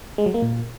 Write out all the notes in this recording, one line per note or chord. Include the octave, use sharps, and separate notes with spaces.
G#3
F#3
A#3
A#2